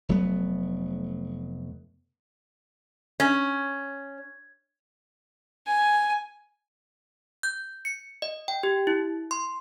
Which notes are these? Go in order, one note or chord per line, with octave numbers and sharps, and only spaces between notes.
F1 F#3 A3 B3
C#4
G#5
G6
C#7
D#5
G5
G4
E4
C6